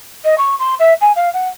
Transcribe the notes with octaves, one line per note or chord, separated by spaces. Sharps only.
D#5
C#6
C6
E5
G#5
F5
F#5